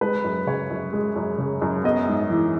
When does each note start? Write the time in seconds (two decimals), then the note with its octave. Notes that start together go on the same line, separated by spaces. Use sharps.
0.01 G#3 B4
0.24 F#2
0.47 C#3 C#5
0.70 F#2
0.93 G#3
1.16 F#2
1.38 C#3
1.62 F#2
1.84 B3 D#5
2.08 G#2
2.30 E3